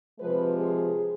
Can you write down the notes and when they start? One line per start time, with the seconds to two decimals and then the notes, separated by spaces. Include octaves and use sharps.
0.19 C3 F3 G#3 B4
0.55 G#4